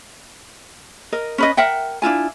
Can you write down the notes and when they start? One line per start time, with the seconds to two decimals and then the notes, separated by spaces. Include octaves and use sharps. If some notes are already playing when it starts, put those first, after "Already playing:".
1.12 A#4 D#5
1.38 C#4 B4 D#5
1.57 A#4 E5 F#5 G5
2.02 D4 E4 F4 G#5